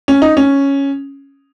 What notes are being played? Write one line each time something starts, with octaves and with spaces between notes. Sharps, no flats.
C#4
D#4
C#4